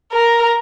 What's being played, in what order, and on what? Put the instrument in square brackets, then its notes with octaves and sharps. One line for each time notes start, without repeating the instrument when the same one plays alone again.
[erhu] A#4